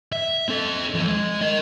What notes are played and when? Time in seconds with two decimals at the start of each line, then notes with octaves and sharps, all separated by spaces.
0.12 E5
0.49 C4 A4
0.94 E2 F3
1.07 G#3
1.41 A#4 D#5